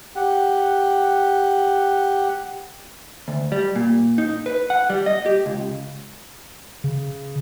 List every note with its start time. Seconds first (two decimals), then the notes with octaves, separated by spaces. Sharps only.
0.16 G4 F#5
3.28 D2
3.52 G3
3.76 A#2
4.18 D#4
4.46 B4
4.70 F#5
4.90 G3
5.06 D#5
5.26 G4
5.46 C#2
6.84 C#3